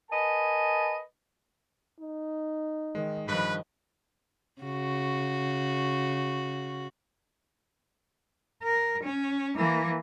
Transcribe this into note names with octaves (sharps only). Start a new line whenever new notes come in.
A#4 B4 D#5 G#5 A5
D#4
D#3 G#3
G2 D#3 F3 B4 B5
C#3 F#4
A#4
C#4
E3 A#3